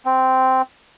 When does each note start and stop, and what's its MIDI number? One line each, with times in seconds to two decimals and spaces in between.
0.05 0.62 60